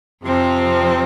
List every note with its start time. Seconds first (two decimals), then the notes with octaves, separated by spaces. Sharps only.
0.24 F2 C3 F3 C4